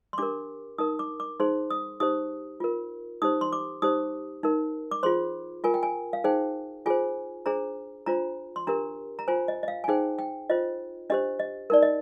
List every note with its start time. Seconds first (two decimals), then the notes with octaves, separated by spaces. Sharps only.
0.13 C6
0.18 D4 G4 A#4 D6
0.78 D#4 A#4 D#6
0.99 D6
1.20 D6
1.40 D#4 G#4 C5 C6
1.70 D#6
2.00 D#4 G4 C5 D#6
2.60 F4 A#4
3.22 D#4 G4 C5 D#6
3.41 C6
3.52 D6
3.82 D#4 G4 C5 D#6
4.43 D#4 A#4
4.91 D6
5.03 F4 G#4 C5 C6
5.64 F4 A#4 G#5
5.74 G5
5.83 G#5
6.13 F5
6.24 D#4 G#4 C5 G5
6.86 F4 G#4 C5 G#5
7.46 D4 G#4 C5 A#5
8.06 D4 F4 C5 A#5
8.56 C6
8.67 D4 G4 A#4 A#5
9.19 A#5
9.28 F4 C5 G#5
9.48 D#5
9.63 D#5
9.68 F5
9.84 G#5
9.88 D#4 G#4 C5 G5
10.19 G5
10.50 F4 C5 D#5
11.10 D4 G4 C5 D#5
11.40 D#5
11.70 D#4 A#4 D5
11.83 D#5